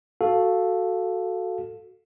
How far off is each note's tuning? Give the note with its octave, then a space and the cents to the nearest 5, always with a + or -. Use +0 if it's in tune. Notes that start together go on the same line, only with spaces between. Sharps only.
F#4 +0 A4 +0 F5 +5